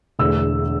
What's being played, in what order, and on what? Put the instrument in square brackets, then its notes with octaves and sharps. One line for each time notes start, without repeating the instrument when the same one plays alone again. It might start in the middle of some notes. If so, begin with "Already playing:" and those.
[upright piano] E1 E2 D3 A3 E6